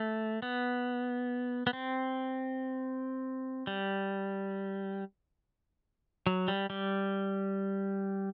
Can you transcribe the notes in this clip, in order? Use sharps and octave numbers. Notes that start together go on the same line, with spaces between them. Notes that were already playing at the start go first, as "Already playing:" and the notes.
Already playing: A3
B3
B3
C4
G3
F#3
G3
G3